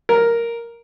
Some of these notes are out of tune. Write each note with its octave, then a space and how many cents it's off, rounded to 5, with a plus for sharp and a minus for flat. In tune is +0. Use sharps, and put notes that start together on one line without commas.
A#4 +0